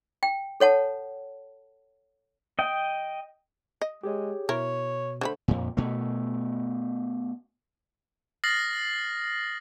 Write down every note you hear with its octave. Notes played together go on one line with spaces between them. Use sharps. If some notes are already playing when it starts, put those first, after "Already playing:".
G5
A4 C#5 F#5 A5
D#5 G5
D#5
G#3 G4 G#4 C#5
B2 E4 A#4 C#5
D3 A3 A4 C5 B5
F2 A#2
B2 A3
D#6 F6 A6 A#6 C7 F#7